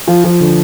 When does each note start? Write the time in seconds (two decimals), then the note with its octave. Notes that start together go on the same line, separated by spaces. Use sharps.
0.08 F3
0.24 F3
0.40 D3